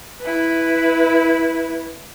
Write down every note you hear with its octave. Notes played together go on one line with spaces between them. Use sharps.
E4 B4